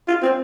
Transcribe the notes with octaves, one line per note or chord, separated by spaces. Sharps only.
F4
C4